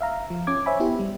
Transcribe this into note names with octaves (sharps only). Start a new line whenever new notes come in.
E5 F5 A#5
F3
C#4 D6 G#6
C5 C#5 E5 G#5 B5
B3 E4 G4
G3